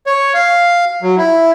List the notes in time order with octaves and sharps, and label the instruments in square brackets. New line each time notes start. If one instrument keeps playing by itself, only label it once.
[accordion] C#5
F5
F#3
E4